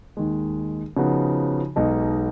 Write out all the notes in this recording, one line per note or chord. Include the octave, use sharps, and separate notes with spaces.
D#2 D#3 G#3
C#3 F3 B3 D#4 F#4
B1 B2 G#3 D#4